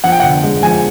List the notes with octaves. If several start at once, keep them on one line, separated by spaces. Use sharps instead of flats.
F3 F#5
G5
D3 F#5
G#3
F3 G#5